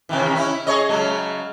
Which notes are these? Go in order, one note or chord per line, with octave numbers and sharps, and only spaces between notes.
C3 D#3 E3
C#4 E4
G#4 C#5 D#5
C#3 F#3 G#3